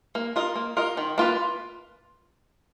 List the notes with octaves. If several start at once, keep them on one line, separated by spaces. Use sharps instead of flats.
A#3
F4 A#4 D#5
A#3
F4 A#4 D#5
D#3
A#3 F4 B4